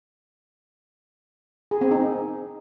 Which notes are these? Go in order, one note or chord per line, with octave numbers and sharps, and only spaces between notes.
G#4
C4
D#4